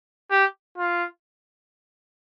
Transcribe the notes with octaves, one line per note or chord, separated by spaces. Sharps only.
G4
F4